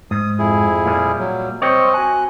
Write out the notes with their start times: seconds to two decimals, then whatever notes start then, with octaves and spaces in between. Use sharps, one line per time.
0.11 G#2 D#6
0.39 F2 E4 G#4
0.86 A#2 G3
1.20 F#3
1.62 G3 C4 C5 C#5 D#5
1.94 F#4 G#5 F#6